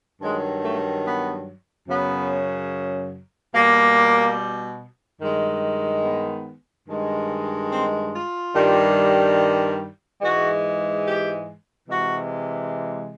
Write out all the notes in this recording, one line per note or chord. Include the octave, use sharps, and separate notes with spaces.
G2 D#3 F#3 G#3
A3
B3
F#2 C#3 F#3 B3
B2 G3 A#3
G2 D#3 G#3
B3
G2 D#3 G#3
C4
F4
G2 D#3 G3
G#2 E3 G#3 F#4
G4
C3 E3 G#3 F#4